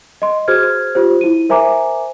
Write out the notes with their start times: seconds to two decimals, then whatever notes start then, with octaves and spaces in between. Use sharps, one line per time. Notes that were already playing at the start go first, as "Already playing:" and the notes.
0.22 D#5 C6
0.48 F#4 G#4 C5 F6 G#6
0.95 F4 G4 C5
1.21 E4 D#7
1.49 A#4 C5 E5 G#5 A#5 D6